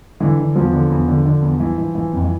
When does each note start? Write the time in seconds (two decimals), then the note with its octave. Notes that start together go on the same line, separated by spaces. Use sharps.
0.20 D3 E3
0.38 D3
0.56 E2 F3
0.73 D3
0.90 E2
1.08 D3
1.25 D3
1.42 E2
1.60 E3
1.78 E3
1.95 E3
2.13 F2
2.22 E3